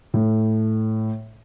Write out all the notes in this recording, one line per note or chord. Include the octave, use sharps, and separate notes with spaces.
A2